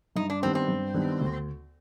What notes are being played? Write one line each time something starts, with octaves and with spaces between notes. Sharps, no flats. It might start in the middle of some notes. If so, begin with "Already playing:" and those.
G2 D#4
D4
D#3 G3 B3 C4 D4
C4
G2
D#3 G3 B3 D4
D2